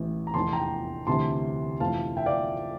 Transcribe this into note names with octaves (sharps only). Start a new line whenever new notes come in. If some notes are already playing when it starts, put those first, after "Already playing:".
Already playing: A1 A2 E3
A#5
F1 E2 E3 A5 C6
G5 A#5
D2 C3 E3 A5 C6
F1 F2 E3 F5 A5
E5 G5
D5 F5